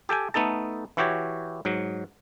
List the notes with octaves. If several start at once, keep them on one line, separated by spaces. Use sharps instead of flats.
G4 A4 G5 G#5
A3 B3 D#4 A4 A5
E3 E4 F#4 G4 C#5
G#2 F#3